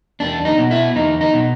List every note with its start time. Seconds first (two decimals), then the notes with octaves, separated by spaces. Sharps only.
0.20 E2 D4
0.45 D#4
0.58 B2
0.71 E4
0.96 E2 D#4
1.21 D#4
1.33 B2